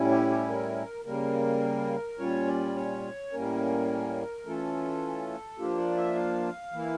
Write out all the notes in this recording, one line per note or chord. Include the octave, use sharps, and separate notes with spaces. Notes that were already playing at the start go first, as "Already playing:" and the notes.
Already playing: A2 G3 C#4 E4
G4
G4
A#4
C#3 G3 A#3 A#4
A#2 G3 C#4 F4 C#5
D5
C#5
A2 G3 A#3 C#4 A#4
E3 A3 C#4 F4 A4
F3 A#3 D4 F4 G4
D5
E5
F5
E3 A#3 E4